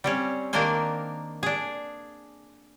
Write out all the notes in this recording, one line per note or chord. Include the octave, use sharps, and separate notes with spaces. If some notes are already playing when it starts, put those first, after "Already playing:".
G3 C4 C#4
D#3 A#3 D4 A#4 C5 G#5
D4 G#4